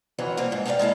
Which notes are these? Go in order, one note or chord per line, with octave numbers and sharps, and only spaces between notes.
F2 E3 F#3 B3 A#4
F2 C3 G3 A#3 C4
G#2
G4 A4 A#4 C5 D5 F5
G#3 A#3 E4 A4